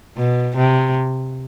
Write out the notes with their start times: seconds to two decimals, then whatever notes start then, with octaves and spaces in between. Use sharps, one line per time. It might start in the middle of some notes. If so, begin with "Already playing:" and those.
0.17 B2
0.57 C3